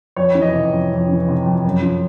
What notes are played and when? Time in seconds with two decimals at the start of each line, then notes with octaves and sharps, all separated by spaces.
0.16 F2 C#5
0.35 E3
0.42 D#5
0.53 C3
0.72 F2
0.91 F2
1.09 E3
1.28 C3
1.46 F2
1.65 F#2
1.82 F3